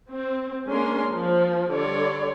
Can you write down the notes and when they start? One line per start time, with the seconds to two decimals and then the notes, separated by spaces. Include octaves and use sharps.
0.11 C4
0.68 G#3 A#3 C#4 D4 A#4 C6
1.11 F3
1.71 D3 G3 C#5 D5 C6